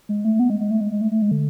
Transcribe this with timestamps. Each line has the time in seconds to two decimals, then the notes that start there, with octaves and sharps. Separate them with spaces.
0.09 G#3
0.25 A3
0.39 B3
0.50 G#3
0.60 G#3
0.71 A3
0.81 G#3
0.91 G#3
1.01 A3
1.11 A3
1.22 G#3
1.31 D3